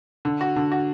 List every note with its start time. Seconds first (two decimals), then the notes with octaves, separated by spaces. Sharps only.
0.25 D3
0.41 F#4
0.56 D3
0.72 F#4